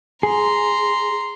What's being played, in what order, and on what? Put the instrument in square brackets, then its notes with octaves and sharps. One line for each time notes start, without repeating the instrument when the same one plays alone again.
[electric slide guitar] G#4 [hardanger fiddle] A#5 C6